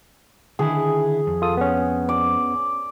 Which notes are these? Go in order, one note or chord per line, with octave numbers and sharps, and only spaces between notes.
D3 D#3 E4 G#4
F2
F4 A4 D#6
B3 C#4
D5